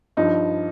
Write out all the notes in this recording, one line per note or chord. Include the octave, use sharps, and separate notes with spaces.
G2 F3 D#4